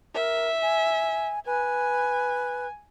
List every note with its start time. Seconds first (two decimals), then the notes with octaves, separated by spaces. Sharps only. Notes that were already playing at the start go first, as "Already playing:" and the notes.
0.15 A#4 E5
0.62 G#5
1.46 B4 G#5